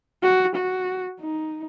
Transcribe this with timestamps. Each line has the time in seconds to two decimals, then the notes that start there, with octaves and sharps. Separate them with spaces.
0.23 F#4
0.56 F#4
1.20 D#4